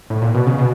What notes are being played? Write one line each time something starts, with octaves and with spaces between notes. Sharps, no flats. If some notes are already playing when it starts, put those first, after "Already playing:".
A2
A#2
B2
C#3
B2